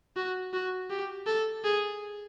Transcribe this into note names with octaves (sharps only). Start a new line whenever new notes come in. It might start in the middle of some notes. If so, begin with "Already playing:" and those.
F#4
F#4
G4
A4
G#4